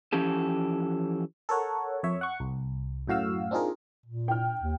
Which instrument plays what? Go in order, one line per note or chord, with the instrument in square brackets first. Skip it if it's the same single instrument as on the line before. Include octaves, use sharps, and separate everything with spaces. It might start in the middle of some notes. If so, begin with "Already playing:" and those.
[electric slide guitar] E3 F3 C#4 G4 A4
[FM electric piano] A4 A#4 C#5 F#5
F2 C#5 E5
F#5 C#6
C2
F#2 A2 F#4 F5 E6
C4 D4 D#4 F4 G#4 A#4
[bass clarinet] A#2
[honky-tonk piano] G5 F6
[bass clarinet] D#2